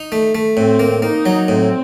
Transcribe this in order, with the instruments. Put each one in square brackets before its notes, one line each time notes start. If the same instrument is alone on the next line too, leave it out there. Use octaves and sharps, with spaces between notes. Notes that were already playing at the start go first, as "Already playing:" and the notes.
Already playing: [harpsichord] D#4
A3
A3
[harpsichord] A2 [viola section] C4
[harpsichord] A#3
[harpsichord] A#3 [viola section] D#4
[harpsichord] F#3
[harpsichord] A2 [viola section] C4